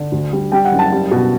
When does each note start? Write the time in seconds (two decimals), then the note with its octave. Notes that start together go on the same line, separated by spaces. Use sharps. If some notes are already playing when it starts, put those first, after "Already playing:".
Already playing: D3
0.12 D2
0.33 G3
0.52 G3 G5
0.65 F#5
0.72 F#1
0.79 A5
0.92 G3
1.11 B2